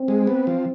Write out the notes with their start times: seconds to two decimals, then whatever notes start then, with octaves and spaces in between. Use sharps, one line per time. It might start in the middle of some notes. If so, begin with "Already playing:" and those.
Already playing: C4
0.08 G#3
0.27 B3
0.47 F3